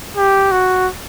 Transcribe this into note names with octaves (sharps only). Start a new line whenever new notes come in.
G4
F#4